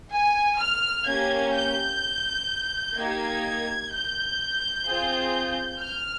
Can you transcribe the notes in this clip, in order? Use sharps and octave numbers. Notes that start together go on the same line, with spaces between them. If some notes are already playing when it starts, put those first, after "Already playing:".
G#5
F6
A#3 C#4 G4 G#6
G6
A#3 D#4 G4 G#6
G6
C4 F4 G#4
F6